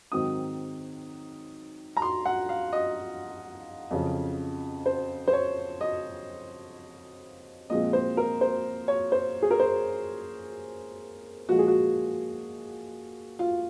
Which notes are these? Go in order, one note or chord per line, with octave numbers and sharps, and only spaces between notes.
G#2 D#3 F#3 C4 D#6
A#5
C6
F#5
F5
D#5
F2 C#3 F#3 C#4
C5
C5
C#5
D#5
A#2 F3 G#3 C4 D#5
C5
A#4
C5
C#5
C5
G#4
A#4
C5
A#2 F3 G#3 F#4
G#4
F#4
F4